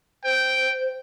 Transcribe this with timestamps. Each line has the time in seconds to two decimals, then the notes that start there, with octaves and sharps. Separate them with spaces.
0.24 C5 G5